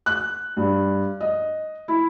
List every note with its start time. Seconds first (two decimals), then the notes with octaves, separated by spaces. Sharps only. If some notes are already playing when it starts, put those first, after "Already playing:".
0.06 F#6
0.57 G2
1.20 D#5
1.88 E4